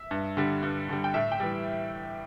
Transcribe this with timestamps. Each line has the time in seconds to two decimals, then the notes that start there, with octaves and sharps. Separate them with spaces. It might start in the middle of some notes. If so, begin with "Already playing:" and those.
Already playing: E5
0.11 G2
0.37 D3 G3
0.63 G2
0.89 D3 G3
1.04 G5
1.14 A2 E5
1.32 G5
1.40 E3 G3